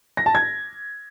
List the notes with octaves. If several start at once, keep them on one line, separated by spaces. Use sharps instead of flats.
A#6
A5
G#6